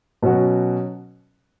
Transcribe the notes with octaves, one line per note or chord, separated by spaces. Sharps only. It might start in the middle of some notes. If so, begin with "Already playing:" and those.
B2 F#3 C#4 F#4